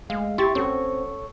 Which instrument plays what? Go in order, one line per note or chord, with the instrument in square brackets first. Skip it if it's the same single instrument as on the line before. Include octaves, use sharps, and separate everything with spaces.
[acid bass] G#3 [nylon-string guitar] A3 [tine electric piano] F5
[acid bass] E4 [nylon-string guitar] G4 [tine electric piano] C6 C#6 A6
[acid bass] C4 [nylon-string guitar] C#4 F#4 [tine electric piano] A4 C#5 C#6